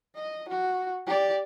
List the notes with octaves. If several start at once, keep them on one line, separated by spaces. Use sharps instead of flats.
D#5
F#4
G4 D5